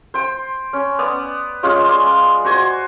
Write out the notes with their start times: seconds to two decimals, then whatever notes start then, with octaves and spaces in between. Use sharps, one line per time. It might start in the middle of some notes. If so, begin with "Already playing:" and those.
0.14 C5 G5
0.73 C#4
0.99 B3 D5
1.63 G#3 C#4 F4 G5
1.88 D5
2.44 F#4 C5 G#5